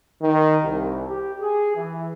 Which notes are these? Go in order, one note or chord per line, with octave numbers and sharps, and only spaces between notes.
D#3
C2
G4
G#4
E3